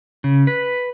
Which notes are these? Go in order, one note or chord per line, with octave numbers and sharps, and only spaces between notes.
C#3
B4